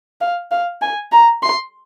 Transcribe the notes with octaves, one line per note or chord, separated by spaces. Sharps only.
F5
F5
G#5
A#5
C6